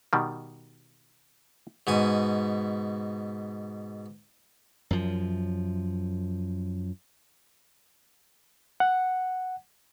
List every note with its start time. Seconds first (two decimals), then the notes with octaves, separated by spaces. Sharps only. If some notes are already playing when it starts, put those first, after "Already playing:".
0.13 B2 D#3 G3
1.87 G#2 B2 G#5
4.91 F#2 F3
8.80 F#5